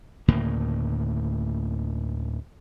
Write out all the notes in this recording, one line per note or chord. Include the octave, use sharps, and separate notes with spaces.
D2 A2 C#3 A#3